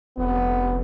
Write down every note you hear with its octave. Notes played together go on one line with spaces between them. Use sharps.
F1 B3